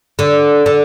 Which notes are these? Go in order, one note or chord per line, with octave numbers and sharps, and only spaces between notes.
D3
D3